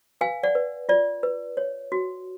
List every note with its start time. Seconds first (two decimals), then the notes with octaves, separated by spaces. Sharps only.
0.21 B4 F5 G#5
0.43 D5 F#5
0.55 B4
0.89 F4 D5
1.23 B4
1.57 C#5
1.92 F#4